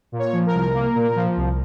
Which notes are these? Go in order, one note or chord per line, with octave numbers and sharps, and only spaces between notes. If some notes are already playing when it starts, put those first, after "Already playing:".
A#2
C#5
F3
A#4
C2
A#3
A#2
F3
C2